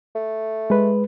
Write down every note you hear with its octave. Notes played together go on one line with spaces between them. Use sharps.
A3
G#3 B4